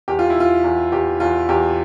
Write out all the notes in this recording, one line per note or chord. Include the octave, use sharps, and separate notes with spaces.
E2 G4
F4
E4
E2 F4
E2
E2 G4
E2 F4
E2 G4